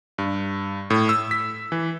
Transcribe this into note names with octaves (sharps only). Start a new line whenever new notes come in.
G2
A2
E6
B6
E3